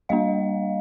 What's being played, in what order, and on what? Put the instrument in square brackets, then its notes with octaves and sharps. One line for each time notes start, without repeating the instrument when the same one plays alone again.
[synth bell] G3 A#3 D4 D#5 F5